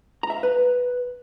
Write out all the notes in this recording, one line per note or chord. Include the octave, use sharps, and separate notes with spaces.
A#5
E5
F5
B4